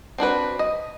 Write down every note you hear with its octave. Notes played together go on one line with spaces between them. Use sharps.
C4 D4 F#4 B4
D#5